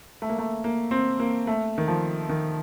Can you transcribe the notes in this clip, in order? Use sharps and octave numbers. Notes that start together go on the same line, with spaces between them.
A3
A#3
A3
A#3
C4
A#3
A3
D#3
F3
D#3